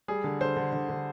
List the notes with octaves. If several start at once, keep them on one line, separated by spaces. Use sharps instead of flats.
G3 G#4
D3
D3 C5
D3
D3
D3